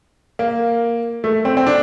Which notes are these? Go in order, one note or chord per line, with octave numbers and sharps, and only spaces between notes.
A#3
A3
C4
C4
D4